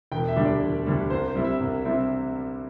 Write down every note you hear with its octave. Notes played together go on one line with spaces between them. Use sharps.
E1 G5
E5
D2 D3 G3 D4
D5
E1
D2 D3 G3 D4
C2 C5
C5
C3 G3 C4 E4
E5
C2
C3 G3 C4 E4